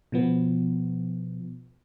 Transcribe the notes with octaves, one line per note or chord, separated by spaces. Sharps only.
B2 F3 B3